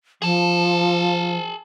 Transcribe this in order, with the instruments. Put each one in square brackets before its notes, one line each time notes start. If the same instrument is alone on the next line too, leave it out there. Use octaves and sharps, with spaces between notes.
[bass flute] F3 [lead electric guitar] G#4 A5